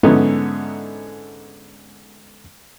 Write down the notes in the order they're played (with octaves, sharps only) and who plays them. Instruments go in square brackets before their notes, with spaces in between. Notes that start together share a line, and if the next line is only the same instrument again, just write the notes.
[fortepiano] G#2 D3 B3 C#4 D#4 E4